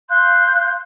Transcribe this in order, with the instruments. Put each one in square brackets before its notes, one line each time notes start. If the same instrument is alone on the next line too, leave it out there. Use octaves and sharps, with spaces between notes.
[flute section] F5 C6 F#6 G6